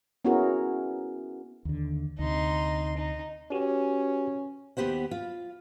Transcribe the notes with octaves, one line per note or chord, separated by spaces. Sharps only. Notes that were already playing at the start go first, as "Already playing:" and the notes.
B3 C#4 E4 F#4 G#4 A#4
D#2 D3
D2 C3 D#4 C6
D#4
C#4 F#4 G4 B4
D#2 B3 G4 C5 F#5
F4